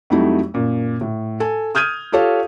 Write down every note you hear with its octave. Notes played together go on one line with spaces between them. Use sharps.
F2 F#3 G3 A3 D#4 E4
F#2 A#2
A2
A4 G#5
D#6 F6 G6 G#6 D#7
F4 G4 A4 C#5 F5